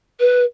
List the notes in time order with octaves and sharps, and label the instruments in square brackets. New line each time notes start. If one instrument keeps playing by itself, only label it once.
[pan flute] B4